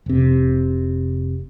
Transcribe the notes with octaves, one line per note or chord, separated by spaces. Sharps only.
F1 C3